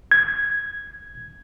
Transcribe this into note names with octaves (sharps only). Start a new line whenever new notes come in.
G#6